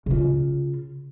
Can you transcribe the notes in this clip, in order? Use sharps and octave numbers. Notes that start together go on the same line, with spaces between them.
C#3 F4